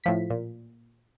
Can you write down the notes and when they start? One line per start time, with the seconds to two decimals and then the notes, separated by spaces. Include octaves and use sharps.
0.04 A2 F3 B6
0.30 A#2